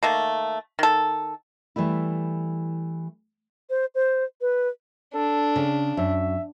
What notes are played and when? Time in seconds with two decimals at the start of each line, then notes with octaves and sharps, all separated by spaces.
0.03 D#3 A3 A#3
0.79 D#3 A4
1.76 E3 G3 A3 E4
3.70 C5
3.95 C5
4.41 B4
5.14 D4 A4
5.56 C#3
5.97 F#2 E5